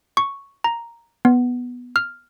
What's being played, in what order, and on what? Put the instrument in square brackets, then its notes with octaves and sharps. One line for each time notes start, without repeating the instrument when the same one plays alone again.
[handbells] C#6
A#5
B3
F6